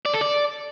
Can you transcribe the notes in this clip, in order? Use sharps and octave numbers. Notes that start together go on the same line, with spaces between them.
D5
A4
D5